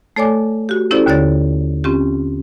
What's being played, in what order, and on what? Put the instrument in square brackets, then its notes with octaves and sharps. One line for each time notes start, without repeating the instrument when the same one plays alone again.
[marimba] A3 A4 C#5 D5 G#5 D6
F#4 G4
C#4 E4 G4 A4 C5 D5
D#2 D3 C#5 D5 A6
C4 C#4 F4 G4